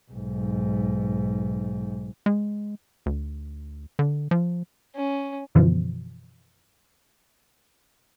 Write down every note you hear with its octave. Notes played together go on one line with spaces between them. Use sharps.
B1 G#2
G#3
D2
D3
F3
C#4
F#2 B2 D3 E3 F3